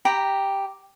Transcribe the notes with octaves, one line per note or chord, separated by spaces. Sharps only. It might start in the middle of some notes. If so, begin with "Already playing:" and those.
G4 G5 A#5 B5